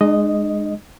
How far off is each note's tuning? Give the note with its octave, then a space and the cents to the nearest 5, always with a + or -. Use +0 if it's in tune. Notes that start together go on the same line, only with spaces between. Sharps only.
G#3 +0 D4 +45 D#5 +0